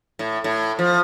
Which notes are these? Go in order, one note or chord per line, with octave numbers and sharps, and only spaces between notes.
A2
A2
F3